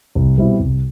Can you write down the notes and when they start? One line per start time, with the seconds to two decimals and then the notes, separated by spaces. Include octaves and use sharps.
0.15 C2
0.38 B2 G3 C4 E4
0.60 C2